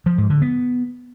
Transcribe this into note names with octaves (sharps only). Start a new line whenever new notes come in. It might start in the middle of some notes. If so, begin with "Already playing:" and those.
F3
G#2
D3
B3